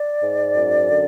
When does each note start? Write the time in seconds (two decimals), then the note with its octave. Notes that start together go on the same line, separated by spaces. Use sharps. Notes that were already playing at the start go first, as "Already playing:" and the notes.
Already playing: D5
0.19 G#2
0.55 F#2
0.91 D3